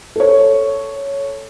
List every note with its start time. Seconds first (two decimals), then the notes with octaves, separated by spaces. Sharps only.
0.16 A4 C#5